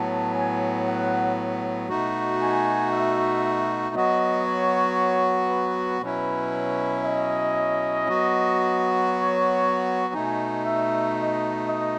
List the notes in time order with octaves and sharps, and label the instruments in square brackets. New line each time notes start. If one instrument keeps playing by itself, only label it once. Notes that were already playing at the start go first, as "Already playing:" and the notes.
Already playing: [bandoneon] A2 F#3 B3 [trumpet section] A5
[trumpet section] G#5
F#5
[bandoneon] B2 A3 D#4 F#4
[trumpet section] G#5
E5
E5
[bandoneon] F#3 B3 F#4 [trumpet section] D#5
[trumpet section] C#5
B4
[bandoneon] B2 F#3 C#4 E4 [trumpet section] B4
[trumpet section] D#5
[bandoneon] F#3 B3 F#4
[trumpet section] C#5
[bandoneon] B2 A3 D#4 [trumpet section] G#5
[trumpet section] E5
D#5
D#5